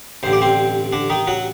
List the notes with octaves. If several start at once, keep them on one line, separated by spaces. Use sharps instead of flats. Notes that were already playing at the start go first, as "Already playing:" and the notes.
A1 G2 D3 C5
D5
C4 C5
D3 D4
D#3 D#4
F#3 F#4